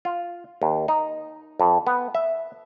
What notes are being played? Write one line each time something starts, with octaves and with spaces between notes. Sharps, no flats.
F4
D#2
D#4
F2
B3
E5